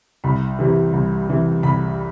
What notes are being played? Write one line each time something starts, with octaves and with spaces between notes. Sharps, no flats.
C2 B5
C3 E3 G3
C2
C3 E3 G3
C2 B5